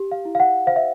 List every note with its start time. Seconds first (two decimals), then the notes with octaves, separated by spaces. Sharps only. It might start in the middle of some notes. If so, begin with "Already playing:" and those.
Already playing: G4
0.12 F5
0.25 E4
0.35 F5
0.40 F#5
0.67 C5 F5
0.76 E5